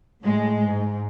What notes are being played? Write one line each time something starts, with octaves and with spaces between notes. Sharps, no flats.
A2 G#3
G#2